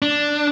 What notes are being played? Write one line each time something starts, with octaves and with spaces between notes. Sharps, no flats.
D4